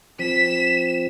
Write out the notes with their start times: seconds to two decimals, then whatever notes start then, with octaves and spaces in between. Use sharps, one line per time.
0.19 F3 C4 B6 E7